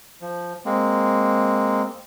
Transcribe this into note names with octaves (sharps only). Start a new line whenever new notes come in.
F3
G#3 A#3 C4